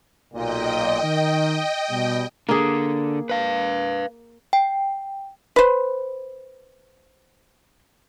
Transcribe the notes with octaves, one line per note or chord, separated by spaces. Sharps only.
B1 A#2 D#5 G5
D#3
B2 G3
D3 A#3 G#4
B4 F5
G5
B4 C5